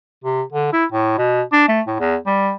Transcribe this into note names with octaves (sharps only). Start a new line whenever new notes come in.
C3
D3
E4
A2
B2
D4
A3
A2
E2
G3